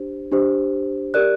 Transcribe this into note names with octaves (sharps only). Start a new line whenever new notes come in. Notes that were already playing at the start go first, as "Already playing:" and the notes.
Already playing: D4 G4 C5
D4 G4 C5
G4 A#4 D5 F#6